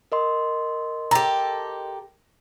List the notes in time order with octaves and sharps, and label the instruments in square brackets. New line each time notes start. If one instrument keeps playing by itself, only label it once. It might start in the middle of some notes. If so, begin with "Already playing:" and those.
[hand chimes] A#4 D#5 C6
[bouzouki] G4 A4 [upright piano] A#5